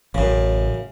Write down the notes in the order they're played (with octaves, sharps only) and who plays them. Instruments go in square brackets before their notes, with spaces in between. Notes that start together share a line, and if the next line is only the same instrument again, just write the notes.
[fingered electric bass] A1 [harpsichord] F#2 C#3